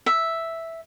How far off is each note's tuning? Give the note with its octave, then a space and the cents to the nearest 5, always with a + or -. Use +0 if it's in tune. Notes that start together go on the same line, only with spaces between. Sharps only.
E5 +0